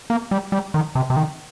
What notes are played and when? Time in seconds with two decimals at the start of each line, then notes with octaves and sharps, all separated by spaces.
0.10 A#3
0.31 G3
0.52 G3
0.74 D#3
0.95 C3
1.10 C3
1.16 D#3